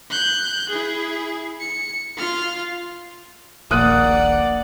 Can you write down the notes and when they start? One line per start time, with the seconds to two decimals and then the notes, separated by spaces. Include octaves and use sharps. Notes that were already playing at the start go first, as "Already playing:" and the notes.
0.10 F#6 G6
0.69 E4 G#4
1.60 C#7
2.17 F4 F6
3.71 D#1 A#1 A#3 D5 F#5 D#6 F#6 D#7